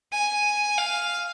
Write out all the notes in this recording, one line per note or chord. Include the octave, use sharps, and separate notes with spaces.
G#5
F5